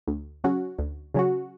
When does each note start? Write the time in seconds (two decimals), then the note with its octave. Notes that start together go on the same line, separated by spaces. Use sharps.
0.07 D2
0.44 C#3 F#3 C#4 F#4
0.79 D2
1.14 C#3 F#3 C#4 F#4